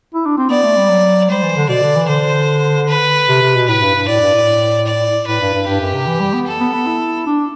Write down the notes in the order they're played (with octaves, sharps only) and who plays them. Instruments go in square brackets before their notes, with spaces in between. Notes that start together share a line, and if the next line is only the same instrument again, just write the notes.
[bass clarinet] E4
D4
C4
[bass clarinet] B3 [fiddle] D5
[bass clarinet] A3
G3
F#3
[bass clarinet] G3 [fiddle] C5
[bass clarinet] E3
D3
[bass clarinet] B2 [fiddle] D5
[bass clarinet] D3
E3
[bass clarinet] D3 [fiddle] C5
[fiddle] B4
[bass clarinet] C3
C3
B2
[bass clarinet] A2 [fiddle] B4
[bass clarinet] G2
G2
[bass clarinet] A2 [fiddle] D5
[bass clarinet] G2
A2
[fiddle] D5
[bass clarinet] A2 [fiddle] B4
[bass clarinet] G2
G2
[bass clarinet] G2 [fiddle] G4
[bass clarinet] F#2
C3
E3
G3
B3
[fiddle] A4
[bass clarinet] B3
B3
E4
D4